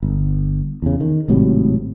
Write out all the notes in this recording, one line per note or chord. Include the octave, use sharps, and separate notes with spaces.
G1
E2 C#3
D#3
G#1 A2 C3 F#3